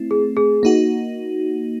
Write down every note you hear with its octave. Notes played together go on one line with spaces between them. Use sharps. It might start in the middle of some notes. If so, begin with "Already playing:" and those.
Already playing: A3 C4 E4
G#4
G#4
A#3 D#4 F#4